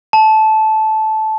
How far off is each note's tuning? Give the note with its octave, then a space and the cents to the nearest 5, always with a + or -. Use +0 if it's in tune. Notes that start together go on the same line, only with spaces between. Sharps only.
A5 -15